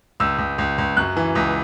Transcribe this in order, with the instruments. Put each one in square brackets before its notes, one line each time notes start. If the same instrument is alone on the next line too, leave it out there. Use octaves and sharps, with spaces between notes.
[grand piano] C#2 E6
C#2
C#2
C#2
F#2 F#6
E3
C#2